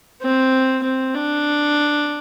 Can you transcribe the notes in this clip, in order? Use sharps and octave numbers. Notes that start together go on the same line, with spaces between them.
C4
C4
D4